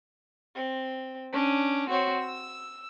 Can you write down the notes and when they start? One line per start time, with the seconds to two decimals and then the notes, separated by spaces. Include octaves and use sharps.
0.54 C4
1.33 C#4 D4
1.89 C4 F#4 C#5
2.20 E6